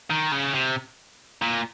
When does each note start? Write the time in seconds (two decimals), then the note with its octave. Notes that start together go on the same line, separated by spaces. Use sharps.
0.10 D#3
0.32 C#3
0.54 C3
1.42 A#2